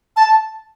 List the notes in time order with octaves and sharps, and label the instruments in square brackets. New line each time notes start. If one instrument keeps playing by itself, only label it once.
[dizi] A5